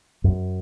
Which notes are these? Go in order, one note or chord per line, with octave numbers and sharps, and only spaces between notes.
F#2